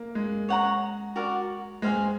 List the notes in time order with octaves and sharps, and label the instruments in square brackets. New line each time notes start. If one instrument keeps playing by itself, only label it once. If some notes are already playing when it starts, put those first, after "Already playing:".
Already playing: [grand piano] A#3
G#3
[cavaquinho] C#5 F#5 A#5
F#4 A#4 D5 F#5
[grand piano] G#3 [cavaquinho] C5 F5 G#5